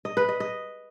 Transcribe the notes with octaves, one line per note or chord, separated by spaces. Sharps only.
D#5
B4
D#5
D#5